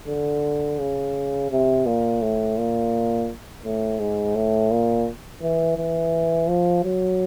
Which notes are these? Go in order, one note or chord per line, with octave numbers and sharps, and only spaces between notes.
D3
C#3
C3
A#2
A2
A#2
A2
G#2
A2
A#2
E3
E3
F3
F#3